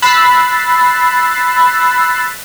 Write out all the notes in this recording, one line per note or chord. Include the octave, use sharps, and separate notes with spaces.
B5 E6 F#6 A6 B6 C7